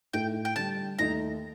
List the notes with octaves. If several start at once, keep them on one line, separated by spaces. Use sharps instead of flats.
A2 A3 D#4 A4 G5
G5
D3 G3 D4 A5
D#2 D#3 A3 D#4 A#5